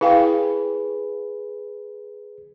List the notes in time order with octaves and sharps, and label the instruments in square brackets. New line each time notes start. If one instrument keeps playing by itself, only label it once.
[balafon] E4 F5 G5 [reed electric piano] G#4 B4